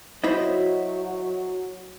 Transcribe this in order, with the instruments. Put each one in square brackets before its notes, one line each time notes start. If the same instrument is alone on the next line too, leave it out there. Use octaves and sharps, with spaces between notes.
[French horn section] F#3 F#4 [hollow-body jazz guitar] E4 C5 D#5